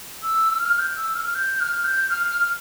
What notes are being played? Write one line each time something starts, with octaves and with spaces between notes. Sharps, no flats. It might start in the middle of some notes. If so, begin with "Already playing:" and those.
E6
F6
G6
E6
F6
G6
F6
G6
F6